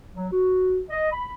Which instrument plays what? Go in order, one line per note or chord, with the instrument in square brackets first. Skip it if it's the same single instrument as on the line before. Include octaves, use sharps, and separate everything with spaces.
[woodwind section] F#3
F#4
D#5
B5